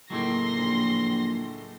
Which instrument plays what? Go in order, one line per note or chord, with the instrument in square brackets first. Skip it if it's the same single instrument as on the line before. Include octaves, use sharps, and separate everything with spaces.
[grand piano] C#2 A2 [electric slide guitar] F#3 A#3 [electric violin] C6 A#6
[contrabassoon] A#1